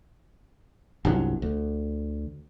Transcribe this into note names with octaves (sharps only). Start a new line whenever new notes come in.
G1 C2 D3 F#3
D2